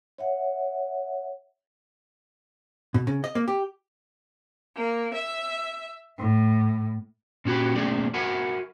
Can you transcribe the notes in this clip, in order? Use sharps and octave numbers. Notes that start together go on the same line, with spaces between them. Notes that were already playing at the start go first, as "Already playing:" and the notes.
C#5 E5 F#5
B2
C#3
D#5
A#3
G4
A#3
E5
A2
A#2 C#4 F#4 G4 B5
D#2 B2 A3 C#4 G#4 D5
F#4 A#4 E5 F#5 G#5 B5